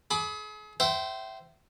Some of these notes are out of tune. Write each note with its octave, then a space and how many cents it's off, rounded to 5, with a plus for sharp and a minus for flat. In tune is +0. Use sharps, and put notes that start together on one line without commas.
G#4 +40 B5 +10 D6 +25
C5 -10 E5 +10 G5 -35